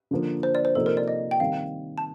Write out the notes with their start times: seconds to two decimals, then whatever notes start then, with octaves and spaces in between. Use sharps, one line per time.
0.11 D3 F3 A#3
0.43 C5
0.55 D5
0.65 C5
0.75 C3 F3 A#3 D#4 A4
0.86 A#4
0.97 D5
1.08 D#5
1.31 G5
1.40 D#3 G3 C4 F5
1.98 A5